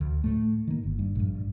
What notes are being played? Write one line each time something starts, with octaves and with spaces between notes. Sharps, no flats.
D2
A2 A3
D#3 A#3
G1
G2
A#1 G2